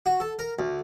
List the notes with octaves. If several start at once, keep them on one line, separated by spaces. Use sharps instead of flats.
F#4
A4
A#4
D2